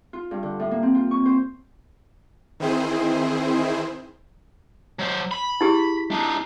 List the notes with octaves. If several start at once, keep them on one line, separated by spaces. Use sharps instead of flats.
F4
G2
D3
A2
A#3
C4
F4
C#6
C5
D#3 E3 C4 E4 G#4 C5
F#3 C5
B5
E4 G4 G#4
D4 D#4